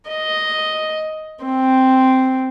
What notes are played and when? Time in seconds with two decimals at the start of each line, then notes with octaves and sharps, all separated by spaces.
0.10 D#5
1.45 C4